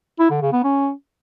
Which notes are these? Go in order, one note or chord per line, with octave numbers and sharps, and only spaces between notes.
E4
D3
C#3
B3
C#4